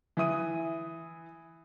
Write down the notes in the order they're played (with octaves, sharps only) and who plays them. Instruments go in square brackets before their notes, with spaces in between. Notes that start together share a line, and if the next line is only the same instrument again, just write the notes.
[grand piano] E3 E5 D#6 D#7